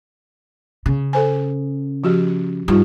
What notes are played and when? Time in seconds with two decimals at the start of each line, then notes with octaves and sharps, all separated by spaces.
0.86 C#3
1.13 A4 C5 G#5
2.04 F3 F#4 G4
2.68 G2 D#4 F4 G4